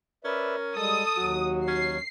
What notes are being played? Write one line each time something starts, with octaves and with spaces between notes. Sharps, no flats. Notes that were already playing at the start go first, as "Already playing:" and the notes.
C#4 A#4 B4 D5 E5
G3 G#3 A4 D#6
D#2 F#3 F#4
C#4 C7